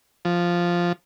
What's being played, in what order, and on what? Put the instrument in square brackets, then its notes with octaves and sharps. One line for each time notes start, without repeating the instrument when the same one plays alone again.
[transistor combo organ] F3